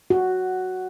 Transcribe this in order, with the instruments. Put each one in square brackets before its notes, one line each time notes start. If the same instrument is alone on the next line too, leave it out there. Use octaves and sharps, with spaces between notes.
[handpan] F#4